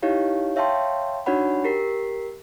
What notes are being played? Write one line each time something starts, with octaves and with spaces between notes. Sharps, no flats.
D#4 E4 G4 C#5 F5
C#5 E5 F5 G5 A5 C6
D4 D#4 F#4 C#5 F#5 B5
G4 A#4 B6 C7